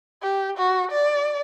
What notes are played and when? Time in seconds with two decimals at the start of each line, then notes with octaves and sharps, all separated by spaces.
0.22 G4
0.57 F#4
0.91 D5